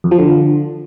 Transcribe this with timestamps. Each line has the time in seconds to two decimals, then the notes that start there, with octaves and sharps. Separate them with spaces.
0.04 F2
0.11 F3
0.19 D3